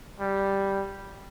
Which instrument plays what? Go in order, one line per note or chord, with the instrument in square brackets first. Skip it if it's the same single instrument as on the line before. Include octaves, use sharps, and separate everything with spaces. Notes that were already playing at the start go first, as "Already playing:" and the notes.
[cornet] G3